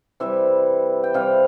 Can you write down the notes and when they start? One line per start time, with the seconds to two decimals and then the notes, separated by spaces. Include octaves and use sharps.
0.20 C3 E3 G3 E5
1.04 G5
1.14 C3 E3 G3 F5